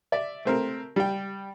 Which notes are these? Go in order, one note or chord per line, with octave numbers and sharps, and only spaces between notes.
D5 E5
A3 C4 A#4
G3 G5